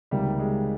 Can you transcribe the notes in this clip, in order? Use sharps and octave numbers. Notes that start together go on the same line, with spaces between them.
C#2 C3 D#3 G3 A#3
G#3